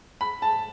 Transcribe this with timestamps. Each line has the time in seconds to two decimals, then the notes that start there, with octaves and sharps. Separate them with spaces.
0.21 B5
0.42 A5